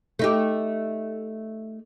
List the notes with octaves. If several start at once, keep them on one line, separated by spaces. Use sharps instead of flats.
A3 D#4 G4